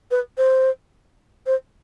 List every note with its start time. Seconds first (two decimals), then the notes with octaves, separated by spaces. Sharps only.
0.11 B4
0.37 C5
1.46 C5